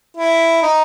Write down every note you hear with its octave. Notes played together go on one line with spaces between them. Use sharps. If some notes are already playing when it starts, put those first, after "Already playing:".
E4
D#4